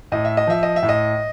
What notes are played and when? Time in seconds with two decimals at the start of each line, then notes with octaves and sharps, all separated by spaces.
0.12 A2 D#5
0.25 E5
0.37 D#5
0.47 F3 E5
0.63 D#5
0.76 E5
0.83 A2
0.89 D#5